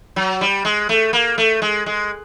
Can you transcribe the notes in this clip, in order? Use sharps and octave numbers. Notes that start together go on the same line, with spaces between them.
F#3
G3
G#3
A3
A#3
A3
G#3
G#3